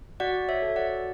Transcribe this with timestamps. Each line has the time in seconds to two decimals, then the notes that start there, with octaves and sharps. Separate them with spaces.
0.20 F#4 D5 F#5
0.49 C#5 E5
0.62 A4
0.76 D5 F#5